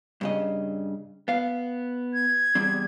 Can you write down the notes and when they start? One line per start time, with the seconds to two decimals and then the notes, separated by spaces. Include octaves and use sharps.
0.21 G2 C#3 D#5
1.28 B3 F5
2.14 G#6
2.55 E2 G3 C4